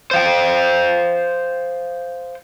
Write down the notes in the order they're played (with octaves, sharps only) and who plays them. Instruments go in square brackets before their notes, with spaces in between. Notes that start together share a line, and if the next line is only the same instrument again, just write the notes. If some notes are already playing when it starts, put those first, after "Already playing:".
[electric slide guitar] C5 F5 G5